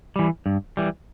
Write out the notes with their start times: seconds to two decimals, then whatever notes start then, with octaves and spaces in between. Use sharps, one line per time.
0.16 E3 G3
0.46 G2
0.77 E3 G3